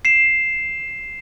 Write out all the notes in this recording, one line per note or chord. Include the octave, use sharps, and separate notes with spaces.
C7 E7